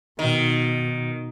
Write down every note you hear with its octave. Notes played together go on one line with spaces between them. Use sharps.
B2 D#3